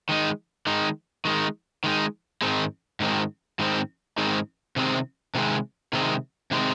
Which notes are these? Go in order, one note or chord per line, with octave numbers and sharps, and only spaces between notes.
D#3 G#3 D#4
D#3 G#3 D#4
D#3 G#3 D#4
D#3 G#3 D#4
G#2 D#3 G#3 C4
G#2 D#3 G#3 C4
G#2 D#3 G#3 C4
G#2 D#3 G#3 C4
C3 D#3 G#3 C4
C3 D#3 G#3 C4
C3 D#3 G#3 C4
C3 D#3 G#3 C4